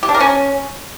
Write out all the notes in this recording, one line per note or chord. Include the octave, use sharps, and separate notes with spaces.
G4
D4
A#4
C#4